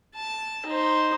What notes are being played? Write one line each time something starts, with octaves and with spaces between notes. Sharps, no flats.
A5
D#4 C5